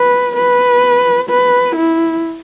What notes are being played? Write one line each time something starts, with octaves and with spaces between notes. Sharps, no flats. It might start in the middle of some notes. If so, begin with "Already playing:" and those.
Already playing: B4
B4
B4
E4